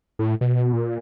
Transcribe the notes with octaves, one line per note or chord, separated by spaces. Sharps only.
A2
B2
A#2